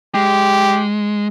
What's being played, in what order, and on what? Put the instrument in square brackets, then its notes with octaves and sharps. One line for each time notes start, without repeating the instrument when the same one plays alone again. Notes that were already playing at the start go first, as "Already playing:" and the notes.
[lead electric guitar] G#3 [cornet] G4